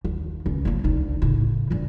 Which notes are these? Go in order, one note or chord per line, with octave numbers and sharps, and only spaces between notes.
D#2
C#2
F3 A#3
D2 D#4
A2 C#3
G1 D2